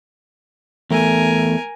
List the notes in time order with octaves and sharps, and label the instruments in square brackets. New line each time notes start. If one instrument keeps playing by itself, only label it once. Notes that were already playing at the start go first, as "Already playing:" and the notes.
[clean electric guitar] E2 A3 [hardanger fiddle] A#4 G#5